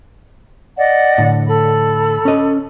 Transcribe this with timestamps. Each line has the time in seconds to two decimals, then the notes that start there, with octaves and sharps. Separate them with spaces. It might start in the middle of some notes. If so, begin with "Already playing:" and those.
0.78 D5 D#5 F#5
1.18 A2 D3
1.47 A4 B5
2.25 C#4 D#5